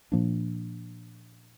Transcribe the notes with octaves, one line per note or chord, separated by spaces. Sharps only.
A#2 F3 A#3 D4